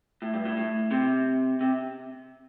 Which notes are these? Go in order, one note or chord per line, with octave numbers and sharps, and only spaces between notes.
A2
G2
A2
A2
C3
C3